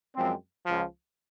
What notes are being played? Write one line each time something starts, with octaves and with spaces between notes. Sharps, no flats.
F#2 F3 G#3 C4
C#2 C#3 F3